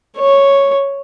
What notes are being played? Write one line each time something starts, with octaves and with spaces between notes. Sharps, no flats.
C#5